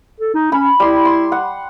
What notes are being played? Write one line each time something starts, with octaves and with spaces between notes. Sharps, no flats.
A4
D#4
C#4 B5
G3 E4 B5 C6
C6
F#5